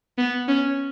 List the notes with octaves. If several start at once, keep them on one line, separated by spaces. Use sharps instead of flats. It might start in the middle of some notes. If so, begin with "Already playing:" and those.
B3
C#4